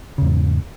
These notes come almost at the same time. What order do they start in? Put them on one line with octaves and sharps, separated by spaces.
C#3 E2 G#2